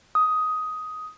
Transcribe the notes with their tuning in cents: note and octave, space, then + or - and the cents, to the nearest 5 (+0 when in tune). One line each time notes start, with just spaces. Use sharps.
D#6 +10